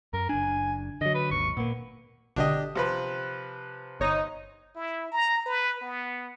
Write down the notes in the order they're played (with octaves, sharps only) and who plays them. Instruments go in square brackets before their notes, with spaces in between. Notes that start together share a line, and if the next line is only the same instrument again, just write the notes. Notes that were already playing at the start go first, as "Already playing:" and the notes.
[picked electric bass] F#2 [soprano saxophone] A#4
[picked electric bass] F#1 D4 [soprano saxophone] G#5
[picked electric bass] D3 F#3 [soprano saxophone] D#5
[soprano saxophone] B4
[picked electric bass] G#1 D#2 [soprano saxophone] C#6
[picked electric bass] A#2 A#3 [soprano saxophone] B3
[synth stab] G#1 B2 D3 [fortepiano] D4 G4 D#5
[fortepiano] C3 F3 B4
[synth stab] G1 C#5 A#6 [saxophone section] D#4
[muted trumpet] E4
A#5
B4
B3